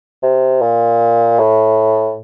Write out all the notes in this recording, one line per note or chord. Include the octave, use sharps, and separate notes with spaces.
C3
A#2
A2